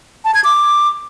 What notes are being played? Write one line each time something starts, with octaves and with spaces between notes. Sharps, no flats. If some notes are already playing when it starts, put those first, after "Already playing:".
A5
G#6
D6